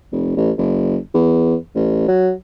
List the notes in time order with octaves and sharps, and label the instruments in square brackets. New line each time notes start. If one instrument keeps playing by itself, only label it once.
[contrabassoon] F1
A1
F#1
E2
A1
F#3